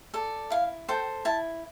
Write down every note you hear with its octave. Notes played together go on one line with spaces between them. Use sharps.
A4 D5
E4 F5
A4 C5 G5
E4 A5